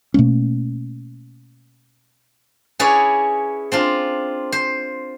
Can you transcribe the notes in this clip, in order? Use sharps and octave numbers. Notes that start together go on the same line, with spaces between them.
B2 A3 A#3 C#4
C#4 E4 G#4 B4 C#5 D5
C4 D4 F4
C5